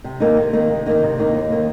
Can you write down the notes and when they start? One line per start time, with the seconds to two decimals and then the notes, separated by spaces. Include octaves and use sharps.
0.04 C3
0.20 D#3 A#3 D#4
0.37 C3
0.53 D#3 A#3 D#4
0.69 C3
0.86 D#3 A#3 D#4
1.02 C3
1.18 D#3 A#3 D#4
1.34 D#2
1.51 D#3 A#3